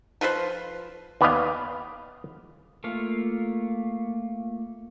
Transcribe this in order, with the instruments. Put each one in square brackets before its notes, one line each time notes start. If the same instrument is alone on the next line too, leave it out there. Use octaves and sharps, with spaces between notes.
[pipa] F3 F4 B4 C5
[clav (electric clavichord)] D#2 B3 B4 D5 D#5 F5
[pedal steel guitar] A3 A#3 F4 F5